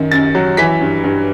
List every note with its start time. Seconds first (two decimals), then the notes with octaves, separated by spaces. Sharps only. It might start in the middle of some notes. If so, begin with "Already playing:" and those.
Already playing: F#2 D#3
0.11 F#2 A6
0.35 F#3
0.57 E3 B6
0.81 G2
1.04 G2